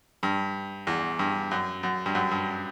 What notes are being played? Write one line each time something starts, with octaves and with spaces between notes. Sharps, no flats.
G2
E2
G2
F#2
F#2
G2
F#2
G2